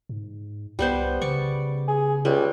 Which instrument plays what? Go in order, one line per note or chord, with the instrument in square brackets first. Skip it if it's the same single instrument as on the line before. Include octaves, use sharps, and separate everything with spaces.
[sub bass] G#2
[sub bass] C2 [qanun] G3 B3 C5
[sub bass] C#3 [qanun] D5 C#6
[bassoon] G#4
[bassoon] C#2 [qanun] G3